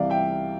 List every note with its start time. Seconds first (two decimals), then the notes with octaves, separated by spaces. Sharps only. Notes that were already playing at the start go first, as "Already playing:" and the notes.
Already playing: C2 C3 E3 D5 F5
0.10 E5 G5